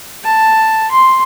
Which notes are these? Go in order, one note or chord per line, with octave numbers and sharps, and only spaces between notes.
A5
C6